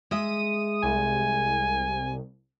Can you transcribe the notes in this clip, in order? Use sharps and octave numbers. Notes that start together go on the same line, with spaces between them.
G#3 E5 D#6 D#7
C2 G#5